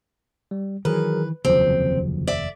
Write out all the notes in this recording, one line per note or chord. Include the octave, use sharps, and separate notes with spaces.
G3
D#3 E3 F#3 G#4 A#4 B4
F1 D#2 C#3 F3 F#3 C4
D5 E5